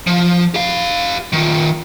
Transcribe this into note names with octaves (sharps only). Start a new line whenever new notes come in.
F3
G4 F5
D#3 F4